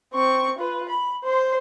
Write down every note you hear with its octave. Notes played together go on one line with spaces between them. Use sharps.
C4 C#6
F4 B4
B5
C5 C6